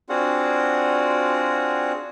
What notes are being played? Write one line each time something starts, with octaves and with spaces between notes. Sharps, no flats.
C4 D4 F4 F#4 G#4 F#5